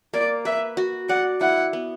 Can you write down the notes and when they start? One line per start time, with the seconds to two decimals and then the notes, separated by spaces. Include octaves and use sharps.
0.14 A#3 D5
0.45 B4 E5
0.77 F#4
1.09 D5 F#5
1.41 E4 F#5
1.73 B3